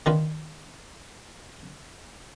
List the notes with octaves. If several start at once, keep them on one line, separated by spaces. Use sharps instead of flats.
D#3 D4 F4 B4